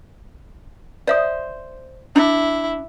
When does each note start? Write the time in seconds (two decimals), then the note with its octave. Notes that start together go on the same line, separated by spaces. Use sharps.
1.07 C5 D5 E5 D#6
2.16 D4 E4